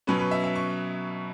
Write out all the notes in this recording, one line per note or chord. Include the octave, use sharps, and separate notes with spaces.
B2 F#3 C#4 B4
B4
E5
E5
C#6